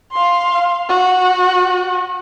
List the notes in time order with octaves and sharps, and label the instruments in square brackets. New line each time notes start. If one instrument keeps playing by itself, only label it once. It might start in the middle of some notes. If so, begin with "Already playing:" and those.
[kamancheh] F5 C6
F#4